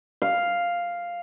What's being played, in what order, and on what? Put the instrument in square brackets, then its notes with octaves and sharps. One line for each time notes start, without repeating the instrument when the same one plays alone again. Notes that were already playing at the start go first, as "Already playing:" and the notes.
[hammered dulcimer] F5